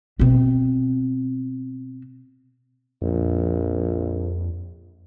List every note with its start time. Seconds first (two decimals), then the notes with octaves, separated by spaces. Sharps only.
0.20 B2 C4
3.02 A#1 F2